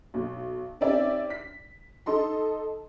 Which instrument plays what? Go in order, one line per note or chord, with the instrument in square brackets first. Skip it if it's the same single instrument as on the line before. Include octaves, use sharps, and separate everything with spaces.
[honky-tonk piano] B1
C4 C#4 D#4 G4 D5 E5
B6
D#4 A4 D#5 C6